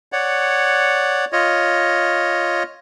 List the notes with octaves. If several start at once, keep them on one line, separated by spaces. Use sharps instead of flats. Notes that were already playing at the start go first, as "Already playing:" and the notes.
C#5 D5 F#5
F4 C#5 D#5